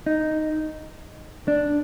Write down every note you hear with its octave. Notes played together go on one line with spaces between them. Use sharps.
D#4
D4